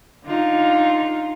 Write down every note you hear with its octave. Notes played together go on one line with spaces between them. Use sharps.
D3 D#4 F4